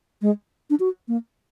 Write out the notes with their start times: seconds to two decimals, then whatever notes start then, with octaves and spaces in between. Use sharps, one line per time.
0.22 G#3
0.70 D4
0.80 F#4
1.08 A#3